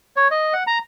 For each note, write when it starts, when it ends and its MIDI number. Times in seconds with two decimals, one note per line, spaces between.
0.16 0.28 73
0.31 0.53 75
0.53 0.64 78
0.67 0.78 82